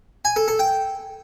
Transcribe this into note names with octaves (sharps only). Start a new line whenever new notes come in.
G#5
A4
A4
G5